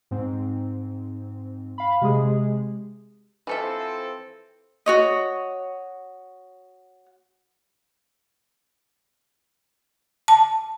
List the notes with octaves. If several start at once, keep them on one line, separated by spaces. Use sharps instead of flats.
G#2 C4
F5 B5
C3 G#3 G#4
E3 F3 C4 A4 E5
F#4 C#5 D#5
A5